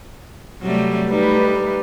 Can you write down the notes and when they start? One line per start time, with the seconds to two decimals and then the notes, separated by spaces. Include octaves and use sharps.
0.62 C3 F#3 G3 A3
1.09 G3 A3 D#4 B4